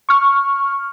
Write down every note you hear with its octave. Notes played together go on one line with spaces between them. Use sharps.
C#6 F6